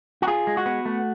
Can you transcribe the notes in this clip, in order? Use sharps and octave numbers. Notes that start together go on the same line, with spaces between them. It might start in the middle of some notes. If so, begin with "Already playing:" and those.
F#4
F4 G#4
G#3
F#4
B3
A3